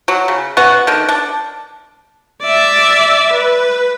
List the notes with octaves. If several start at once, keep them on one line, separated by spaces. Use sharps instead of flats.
F#3
C#3
B3 C#4 F#4 F#5
D3 D#3
D4
D5 E5
B4